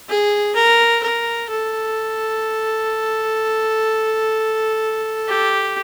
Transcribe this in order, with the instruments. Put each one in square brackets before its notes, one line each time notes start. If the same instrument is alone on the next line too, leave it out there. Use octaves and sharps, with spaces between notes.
[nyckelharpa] G#4
A#4
A#4
A4
G4